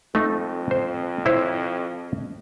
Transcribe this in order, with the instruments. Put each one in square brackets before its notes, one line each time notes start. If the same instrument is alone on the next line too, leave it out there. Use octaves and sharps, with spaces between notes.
[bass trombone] F2 [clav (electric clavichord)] A3 D#4
[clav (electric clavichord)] C5
E4 C5 C#5